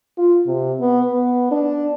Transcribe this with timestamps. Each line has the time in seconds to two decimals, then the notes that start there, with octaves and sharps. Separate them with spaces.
0.18 F4
0.47 C3
0.80 B3
1.12 B3
1.51 D4